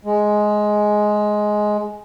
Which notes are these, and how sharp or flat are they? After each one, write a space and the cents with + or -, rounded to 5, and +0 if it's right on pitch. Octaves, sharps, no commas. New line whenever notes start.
G#3 +10